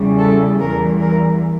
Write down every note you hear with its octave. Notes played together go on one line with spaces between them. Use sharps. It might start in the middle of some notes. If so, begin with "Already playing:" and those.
Already playing: E2 C#3 E3 G3
A4
E2 E3 G3 A#4
A#4